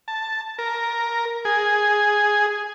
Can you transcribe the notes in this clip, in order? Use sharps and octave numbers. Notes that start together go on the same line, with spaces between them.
A5
A#4
G#4